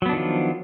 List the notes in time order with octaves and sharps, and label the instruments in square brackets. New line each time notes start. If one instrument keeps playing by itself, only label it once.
[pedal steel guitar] F#3
B3
D4
D#3
F3